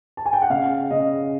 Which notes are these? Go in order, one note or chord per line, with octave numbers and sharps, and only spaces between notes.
A5
G#5
G5
F#5
C#3 F5
C#3 D#5